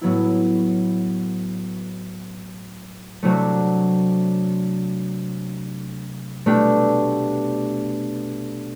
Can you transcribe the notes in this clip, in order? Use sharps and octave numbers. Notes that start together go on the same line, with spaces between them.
A2 F#3 B3 E4
C3 F#3 A3 D4 F#4
B2 A3 D4 G4